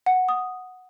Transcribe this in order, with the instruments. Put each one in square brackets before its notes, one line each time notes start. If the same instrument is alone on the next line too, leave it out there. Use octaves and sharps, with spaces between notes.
[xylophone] F#5
D#6